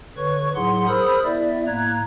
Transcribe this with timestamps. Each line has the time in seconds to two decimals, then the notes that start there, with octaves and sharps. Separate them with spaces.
0.17 D3 B4 C#5 C#6
0.55 A2 F#3 D#4 G#4 F#5 C6
0.87 G#4 A#4 C5 B5 D#6 E6
1.24 B3 E4 D5 E5
1.67 A2 A#3 A#5 F#6 G#6